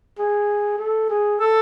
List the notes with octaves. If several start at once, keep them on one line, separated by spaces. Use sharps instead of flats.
G#4
A4
G#4
A4